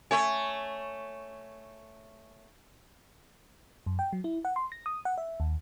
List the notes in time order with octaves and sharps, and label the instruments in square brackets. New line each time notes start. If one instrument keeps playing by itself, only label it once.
[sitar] A3 C#5 [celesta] G#5 C#6
[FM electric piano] F#2
G5
F#3
E4
F#5
C6
A#6
D#6
F#5
E5
D#2